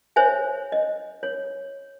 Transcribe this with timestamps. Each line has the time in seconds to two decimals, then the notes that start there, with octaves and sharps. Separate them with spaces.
0.16 C5 C#5 E5 G#5
0.72 D#5
1.23 C#5